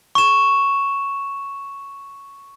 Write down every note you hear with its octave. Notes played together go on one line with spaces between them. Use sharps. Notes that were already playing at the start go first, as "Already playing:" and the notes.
C#6 E7